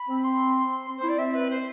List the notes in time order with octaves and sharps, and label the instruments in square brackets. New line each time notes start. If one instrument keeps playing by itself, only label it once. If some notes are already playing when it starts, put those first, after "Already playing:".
Already playing: [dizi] B5
[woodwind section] C4
[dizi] C6
[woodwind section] C4
[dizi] C5
[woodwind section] E4
[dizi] D5
[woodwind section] C4 [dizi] E5
[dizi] B4
C5